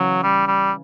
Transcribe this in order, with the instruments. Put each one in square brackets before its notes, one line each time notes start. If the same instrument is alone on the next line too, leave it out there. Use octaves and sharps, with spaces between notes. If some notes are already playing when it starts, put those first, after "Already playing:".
Already playing: [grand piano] C#3 E3 [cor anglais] F#3
[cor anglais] G3
G3